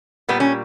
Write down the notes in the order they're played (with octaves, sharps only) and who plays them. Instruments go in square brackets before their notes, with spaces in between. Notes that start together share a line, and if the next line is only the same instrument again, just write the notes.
[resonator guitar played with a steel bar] A#2 G3 B3
C#4